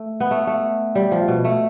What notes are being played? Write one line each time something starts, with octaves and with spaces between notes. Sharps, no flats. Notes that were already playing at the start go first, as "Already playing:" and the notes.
Already playing: A3
B3
A3
A3
G3
F3
B2
A3